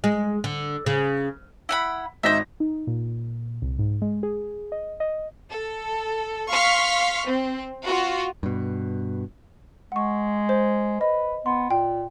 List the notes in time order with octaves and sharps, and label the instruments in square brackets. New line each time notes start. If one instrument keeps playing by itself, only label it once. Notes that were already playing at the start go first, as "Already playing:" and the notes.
[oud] G#3
D3
C#3
[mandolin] E4 F#5 B5
[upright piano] G#1 D#4 A#6 [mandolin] C5 E5
[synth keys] D#4
A#2
C2
G#2
G#3
G#4
D#5
D#5
[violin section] A4
F5 C6 C#6 F6 B6
C4
F4 F#4
[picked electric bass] G2 B2
[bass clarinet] G#3 [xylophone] F#5 C#6
[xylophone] C5
[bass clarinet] B4 [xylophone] D#5
[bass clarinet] B3 [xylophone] C6
[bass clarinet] A#2 [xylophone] G5